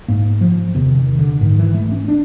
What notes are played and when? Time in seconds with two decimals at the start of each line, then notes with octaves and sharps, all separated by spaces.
0.08 G#2 A#3
0.41 F3
0.74 E2 C3 D#3
0.97 D#3
1.19 D3
1.41 G#2 D#3
1.58 E3
1.74 A3
1.92 C#4
2.08 D4